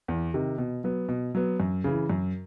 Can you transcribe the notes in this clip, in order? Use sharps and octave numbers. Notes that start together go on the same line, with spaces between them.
E2
C3 D#3
B2
F#3 B3
B2
F#3 B3
F#2
C#3 E3
F#2